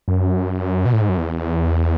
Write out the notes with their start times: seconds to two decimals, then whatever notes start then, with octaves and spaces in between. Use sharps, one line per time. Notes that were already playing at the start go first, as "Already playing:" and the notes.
0.08 F#2
0.86 B2
0.93 A2
1.01 G#2
1.09 F#2
1.17 E2